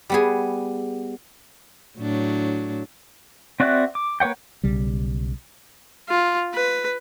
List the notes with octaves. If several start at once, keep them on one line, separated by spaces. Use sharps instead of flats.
G3 B3 G#4
A2 F#3 D4
C4 F#4 D5 E5 F#6
D6
A#3 B4 C#5 F#5 G5
B1 C#3 G3
F4
B4